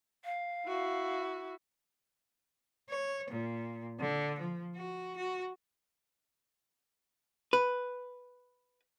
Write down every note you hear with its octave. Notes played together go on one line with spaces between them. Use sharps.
F5
E4 F#4
C#5
A#2
D3
F3
F#4
F#4
B4